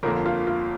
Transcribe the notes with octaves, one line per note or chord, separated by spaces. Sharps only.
G1 F2 D3 A#3 A#4
F4
F4